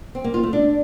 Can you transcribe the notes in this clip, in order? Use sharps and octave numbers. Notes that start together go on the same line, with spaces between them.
C4
A#3
F4
A3
D4